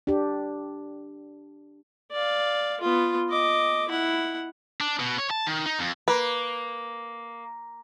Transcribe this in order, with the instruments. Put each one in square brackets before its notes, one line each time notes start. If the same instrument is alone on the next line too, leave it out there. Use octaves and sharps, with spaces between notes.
[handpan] D4 G4
[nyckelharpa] D5 F5
B3 F4
D#5 D6
E4 F#5
[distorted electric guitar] D4
B2
C#5
A5
D#3
D#4
F2
[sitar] A#3 [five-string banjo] B4